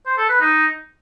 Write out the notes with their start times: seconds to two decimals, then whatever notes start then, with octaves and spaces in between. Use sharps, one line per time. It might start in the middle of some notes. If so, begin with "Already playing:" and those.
0.06 C5
0.18 A4
0.29 B4
0.41 D#4